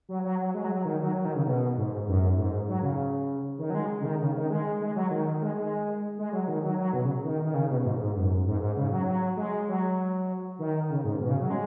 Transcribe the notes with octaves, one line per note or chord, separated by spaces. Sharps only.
F#3
F#3
F#3
G#3
F#3
F#3
D#3
F#3
F#3
D#3
C#3
B2
G#2
F#2
G#2
F#3
C#3
D#3
F#3
G#3
C#3
D#3
C#3
D#3
G#3
G#3
F#3
D#3
G#3
G#3
G#3
F#3
D#3
F#3
F#3
B2
C#3
D#3
D#3
C#3
B2
B2
G#2
G#2
F#2
G#2
G#2
C#3
F#3
F#3
G#3
F#3
D#3
C#3
G#2
B2
C#3
F#3
G#3